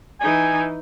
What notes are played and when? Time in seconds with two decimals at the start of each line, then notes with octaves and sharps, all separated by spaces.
0.21 E3 D#4 G#5